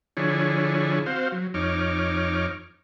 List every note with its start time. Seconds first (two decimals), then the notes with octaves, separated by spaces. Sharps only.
0.17 D3 F3 D4 E4 G#4 C#5
1.06 C4 F#4 C5 F5
1.32 F#3
1.54 F2 D#4 C#5 D6 F6